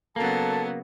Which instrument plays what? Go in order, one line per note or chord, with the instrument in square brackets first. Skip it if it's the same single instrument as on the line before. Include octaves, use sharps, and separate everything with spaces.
[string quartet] C#3 F#3 B3 [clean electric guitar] A#3 [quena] A4 [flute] A5